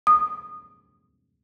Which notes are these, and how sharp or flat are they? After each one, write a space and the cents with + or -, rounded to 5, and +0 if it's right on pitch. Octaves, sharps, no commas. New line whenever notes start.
D#6 -20